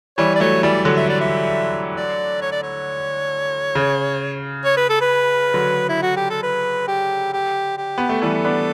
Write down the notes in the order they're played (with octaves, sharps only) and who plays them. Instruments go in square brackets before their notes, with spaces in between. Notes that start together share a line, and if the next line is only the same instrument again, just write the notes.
[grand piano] E3 G3 [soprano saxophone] C#5
[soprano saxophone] D5
[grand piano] F#3 A3 [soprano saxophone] C#5
[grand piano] E3 G3 [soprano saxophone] D5
[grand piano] D3 F#3
[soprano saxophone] E5
D5
E5
D5
C#5
D5
C#5
[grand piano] C#3
[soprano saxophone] C#5
B4
A4
B4
[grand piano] D3 F#3
[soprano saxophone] E4
F#4
G4
A4
B4
G4
G4
G4
[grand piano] B3
A3
[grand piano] E3 G3 [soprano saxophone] A4
[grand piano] B3 D4